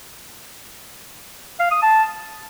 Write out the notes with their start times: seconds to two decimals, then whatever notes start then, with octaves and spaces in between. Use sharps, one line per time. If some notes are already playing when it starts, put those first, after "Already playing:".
1.60 F5
1.71 D#6
1.82 A5